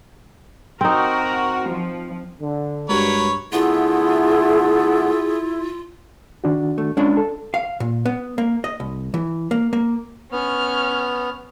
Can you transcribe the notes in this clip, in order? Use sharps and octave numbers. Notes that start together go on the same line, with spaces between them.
C4 D#4 F#4 A#4
F3
D3
G2 G#3 F#4 G4 A#4 B4 C#5
D3 A3 B3 E4 F4 G#4
D#3 D4 F#4
A3
G#3 C#4 D4 F4
A4
F5
A#2
B3
A#3
D#5
C2
E3
A#3
A#3
B3 C#4 F6